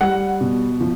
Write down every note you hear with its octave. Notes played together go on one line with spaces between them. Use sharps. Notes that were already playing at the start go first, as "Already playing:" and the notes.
G3 F#5
B2
F3